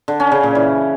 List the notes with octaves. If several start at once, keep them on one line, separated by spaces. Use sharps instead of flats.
D3
C#4
C#3
A#2
E3